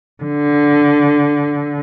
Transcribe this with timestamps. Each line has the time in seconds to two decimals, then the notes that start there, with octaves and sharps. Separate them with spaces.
0.24 D3